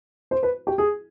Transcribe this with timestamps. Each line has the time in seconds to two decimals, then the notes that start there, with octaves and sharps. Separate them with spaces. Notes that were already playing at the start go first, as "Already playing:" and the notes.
0.31 C5
0.43 B4
0.67 G4
0.78 G#4